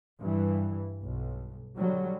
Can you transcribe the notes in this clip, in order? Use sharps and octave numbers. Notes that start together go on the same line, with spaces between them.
G2 E3
B1
D3 F#3 G3